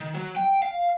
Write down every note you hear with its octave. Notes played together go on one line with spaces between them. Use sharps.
D#3
F#3
G5
F5